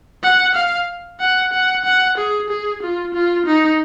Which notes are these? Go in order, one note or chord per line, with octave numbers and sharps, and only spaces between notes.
F#5
F5
F#5
F#5
F#5
G#4
G#4
F4
F4
D#4